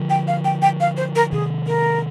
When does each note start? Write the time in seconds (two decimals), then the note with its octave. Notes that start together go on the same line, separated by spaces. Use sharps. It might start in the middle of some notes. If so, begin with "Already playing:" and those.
Already playing: D3 F3
0.10 G5
0.28 F5
0.45 G5
0.62 G5
0.80 F5
0.97 C5
1.16 A#4
1.32 C3 D#3 G#4
1.67 A#4